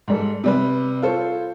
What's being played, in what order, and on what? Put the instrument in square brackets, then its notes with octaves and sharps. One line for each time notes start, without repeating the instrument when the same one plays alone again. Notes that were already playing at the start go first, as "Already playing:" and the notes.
[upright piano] G#2 G3 A4
C3 G3 B4
F4 A4 C5 C#5